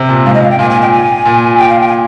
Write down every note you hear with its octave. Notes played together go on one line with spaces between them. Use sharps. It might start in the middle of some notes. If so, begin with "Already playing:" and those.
Already playing: C3
A#2
G#2 F5
D#5
F5
G5
A#2 G#5
G#5
G5
G#5
A#2
G5
F5
G5
G#5